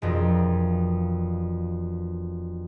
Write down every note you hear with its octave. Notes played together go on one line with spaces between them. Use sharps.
E1 F2 A#4